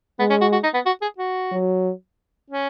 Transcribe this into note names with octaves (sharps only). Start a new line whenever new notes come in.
G#3 B3
C#4
F#4
F#4
D#4
B3
F#4
G#4
F#4
F#3
C#4